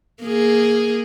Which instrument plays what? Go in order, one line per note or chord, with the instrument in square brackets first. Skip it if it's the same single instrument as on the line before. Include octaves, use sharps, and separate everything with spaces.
[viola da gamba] A#3 G#4